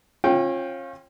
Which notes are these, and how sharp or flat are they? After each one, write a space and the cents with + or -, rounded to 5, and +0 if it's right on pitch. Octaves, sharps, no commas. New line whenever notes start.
C#4 -35 F4 +10 G5 +0